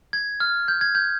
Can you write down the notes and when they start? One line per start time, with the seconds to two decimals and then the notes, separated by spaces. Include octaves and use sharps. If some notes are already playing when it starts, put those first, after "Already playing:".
0.13 G#6
0.40 F6
0.68 G6
0.81 G#6
0.95 G6